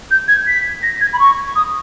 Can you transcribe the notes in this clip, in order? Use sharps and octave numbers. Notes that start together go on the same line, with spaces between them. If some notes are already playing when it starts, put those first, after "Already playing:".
G6
G#6
B6
A#6
G#6
B5
C#6
D#6